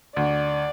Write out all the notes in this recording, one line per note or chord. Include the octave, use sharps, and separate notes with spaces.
D2 D5